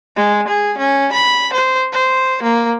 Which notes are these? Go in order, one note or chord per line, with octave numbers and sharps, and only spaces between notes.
G#3
G#4
C#4
B5
C5
C5
A#3